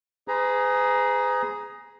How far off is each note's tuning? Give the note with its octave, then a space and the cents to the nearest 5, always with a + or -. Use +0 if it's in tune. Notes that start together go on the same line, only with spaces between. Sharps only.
G#4 +0 B4 +45 A#5 +15